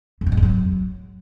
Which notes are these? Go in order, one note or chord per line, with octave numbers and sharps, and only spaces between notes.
F2
C#3
G#2
F2
F#3